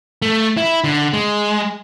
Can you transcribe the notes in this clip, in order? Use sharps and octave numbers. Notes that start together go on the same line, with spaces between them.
A3
E4
D3
G#3